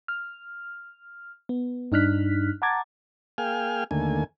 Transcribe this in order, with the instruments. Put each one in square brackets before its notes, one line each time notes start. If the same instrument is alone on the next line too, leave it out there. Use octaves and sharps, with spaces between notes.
[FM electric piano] F6
B3
G2 D4 D#4 F6 F#6 B6
F#5 A5 A#5 D6 G#6 A6
[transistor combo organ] A#3 G#4 F5 G5 G#5 F6
D#2 D3 A3 A#3 G#5